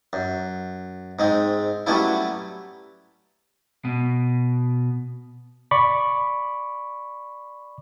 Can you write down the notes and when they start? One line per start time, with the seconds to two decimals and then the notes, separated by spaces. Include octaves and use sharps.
0.13 F#2
1.19 G#2 G#3 C4
1.87 F#3 G3 A3 B3 C#4 E4
3.85 B2
5.71 D5 B5 C#6 D6